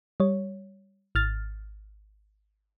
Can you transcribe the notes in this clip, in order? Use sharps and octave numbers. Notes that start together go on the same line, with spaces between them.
G3 C#5
G#1 F6 A6